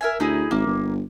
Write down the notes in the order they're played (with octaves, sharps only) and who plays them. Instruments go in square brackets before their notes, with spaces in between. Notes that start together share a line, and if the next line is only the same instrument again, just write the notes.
[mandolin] A#4 E5 G#5
[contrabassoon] D2 [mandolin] D#4 E4 G#4
[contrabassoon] G#1 [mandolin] A#3
[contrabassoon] G1